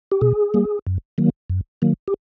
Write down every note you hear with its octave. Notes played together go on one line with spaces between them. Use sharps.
G4
B2 G#4
G3 A#3
F#2
D#3 F#3 A#3
F#2
D#3 F#3 A#3
G4